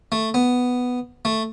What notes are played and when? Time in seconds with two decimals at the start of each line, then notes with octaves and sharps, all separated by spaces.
0.12 A3
0.34 B3
1.25 A3